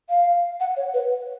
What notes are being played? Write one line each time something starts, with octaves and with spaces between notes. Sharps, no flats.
F5
F#5
C#5
B4